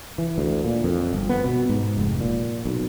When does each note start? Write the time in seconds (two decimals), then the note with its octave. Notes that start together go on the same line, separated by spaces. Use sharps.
0.18 E3
0.38 D2
0.64 A#2
0.84 F2
1.13 G1
1.29 B3
1.44 B2
1.69 G#2
1.97 F1
2.20 A#2
2.65 B1